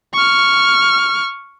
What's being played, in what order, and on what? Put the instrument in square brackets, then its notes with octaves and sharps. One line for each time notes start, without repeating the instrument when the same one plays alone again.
[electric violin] C#6 F6